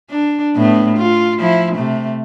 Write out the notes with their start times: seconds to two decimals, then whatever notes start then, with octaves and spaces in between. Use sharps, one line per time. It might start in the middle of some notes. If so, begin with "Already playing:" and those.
0.11 D4
0.56 A2 A3 B3
0.97 F4
1.39 F3 E4
1.75 C3 A3